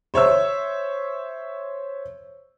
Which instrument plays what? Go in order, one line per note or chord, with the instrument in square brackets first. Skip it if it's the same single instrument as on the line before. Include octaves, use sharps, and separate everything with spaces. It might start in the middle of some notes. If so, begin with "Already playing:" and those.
[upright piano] C5 C#5 E5 E6